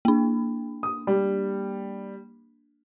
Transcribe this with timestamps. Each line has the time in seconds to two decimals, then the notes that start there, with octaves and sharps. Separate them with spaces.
0.05 A#3 D4
0.83 D#6
1.07 G3